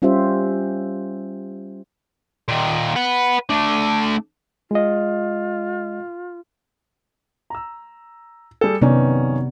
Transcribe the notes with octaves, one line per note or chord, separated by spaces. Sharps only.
G3 C#4 F4 G4 C5 E5
A#2 D#3
B4 F#5
A3 D4
G#3 F4 D#5
A#5 E6
G3 G#4 A4
F#2 C3 D#3 B3 C#4 D5